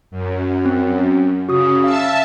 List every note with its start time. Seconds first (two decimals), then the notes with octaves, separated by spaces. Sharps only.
0.11 F#2
0.65 C4
1.49 C#3 F#4 D#6
1.84 E5 F5 A5 E6